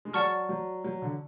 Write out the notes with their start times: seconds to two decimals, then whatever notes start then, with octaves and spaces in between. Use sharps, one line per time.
0.05 G#3
0.13 F#3 D5 F#5 A5 C#6 F6
0.49 F#3
0.84 F#3
1.02 D3